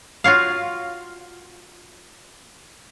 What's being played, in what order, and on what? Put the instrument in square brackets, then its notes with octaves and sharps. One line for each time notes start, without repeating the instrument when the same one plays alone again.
[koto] F4 F#4 C#5 F5